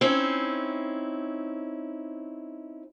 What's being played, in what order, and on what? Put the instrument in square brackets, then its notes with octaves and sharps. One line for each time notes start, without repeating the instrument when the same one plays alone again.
[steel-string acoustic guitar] C4 C#4 D#4 E4